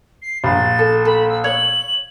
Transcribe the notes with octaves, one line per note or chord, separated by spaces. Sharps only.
C7
A#1 A6
A4
A4 B5
E6
C#5 F#7